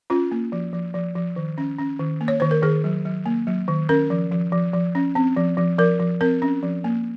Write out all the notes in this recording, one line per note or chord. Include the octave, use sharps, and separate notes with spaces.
C#4 F4
A#3
F3
F3
F3
F3
D#3
C#4
C#4
D#3
A#3
C#5
D#3 C5
A#4
D#3 G#4
F#3
F#3
A#3
F#3
D#3
C#4 A#4
F3
F3
F3
F3
C#4
C4
F3
F3
F3 A#4
F3
C4 A#4
C#4
F3
A#3